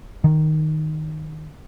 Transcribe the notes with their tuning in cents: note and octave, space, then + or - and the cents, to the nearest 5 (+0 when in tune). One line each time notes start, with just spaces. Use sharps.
D#3 -5